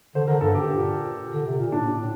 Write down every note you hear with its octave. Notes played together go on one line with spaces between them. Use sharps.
D3 C5
D3 A#4
G2 A4
G4
A#2
D3
C3
A#2
A2 D4
A2